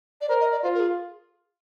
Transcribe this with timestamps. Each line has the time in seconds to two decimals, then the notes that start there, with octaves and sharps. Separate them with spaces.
0.21 D5
0.29 A#4 C5
0.41 D#5
0.52 D5
0.63 F4 C5
0.74 A#4
0.80 G#4